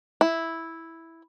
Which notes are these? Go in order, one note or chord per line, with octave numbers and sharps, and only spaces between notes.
E4